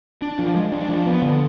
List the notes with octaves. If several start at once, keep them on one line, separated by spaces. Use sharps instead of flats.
D4
F3
G#3
D4
F3
B3
D3